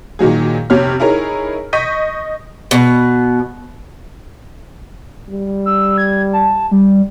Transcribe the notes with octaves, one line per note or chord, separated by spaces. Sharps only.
A#2 D#3 F#3 G#4
F1 C3 C#5 F6
D#4 E4 G#4 A#4 C#5
D#5 C#6 G6 B6 D#7
B2
G3
E6
G#6
A5
G3